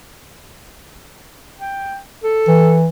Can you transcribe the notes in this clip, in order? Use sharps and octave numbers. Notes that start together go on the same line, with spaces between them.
G5
A4
E3